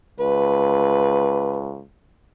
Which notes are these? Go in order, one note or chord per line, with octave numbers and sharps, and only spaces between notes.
C#2 B4